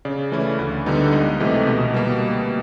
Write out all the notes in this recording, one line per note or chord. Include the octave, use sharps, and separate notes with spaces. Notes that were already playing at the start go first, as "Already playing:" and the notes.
C#3 D5
E3 A3 C#4 E4
D2
D3 G3 B3 D#4
C#2 D#5
C3 E3 A3
B2
G3 A#3